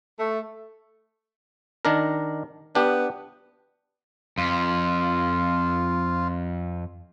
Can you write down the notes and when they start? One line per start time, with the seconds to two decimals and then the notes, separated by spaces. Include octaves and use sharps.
0.18 A3
1.85 D#3 D4 A#4
2.75 B3 D4 G4
4.38 F2 F4